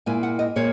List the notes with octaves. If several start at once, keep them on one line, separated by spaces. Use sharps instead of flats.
A#2 A#3 E4 G#5
F#5
D#5
A#2 A#3 C#5